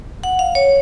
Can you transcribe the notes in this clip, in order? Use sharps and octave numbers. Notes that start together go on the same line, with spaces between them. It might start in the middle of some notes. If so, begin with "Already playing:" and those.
F#5
F5
C#5